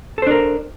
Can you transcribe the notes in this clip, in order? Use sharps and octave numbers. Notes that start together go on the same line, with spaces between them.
D4 A4 A#4 C5